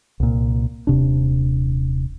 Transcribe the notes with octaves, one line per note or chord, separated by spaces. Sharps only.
C2 A#2
D#1 C3 D4